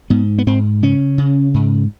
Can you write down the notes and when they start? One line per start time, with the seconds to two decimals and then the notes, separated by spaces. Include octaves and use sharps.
0.10 G#2 B3
0.38 B3
0.47 G#2 C4
0.82 C#3 C#4
1.18 C#3
1.54 G#2